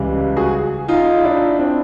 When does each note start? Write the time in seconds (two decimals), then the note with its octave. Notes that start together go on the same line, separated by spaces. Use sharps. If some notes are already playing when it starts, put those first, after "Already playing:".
Already playing: C#2 C#3 E3 G3
0.37 F#4 G#4
0.88 D#4 F4
1.24 D4 E4
1.59 C4 D4